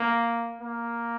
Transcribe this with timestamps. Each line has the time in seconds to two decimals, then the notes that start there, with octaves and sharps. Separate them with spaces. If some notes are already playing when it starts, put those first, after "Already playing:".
Already playing: A#3
0.61 A#3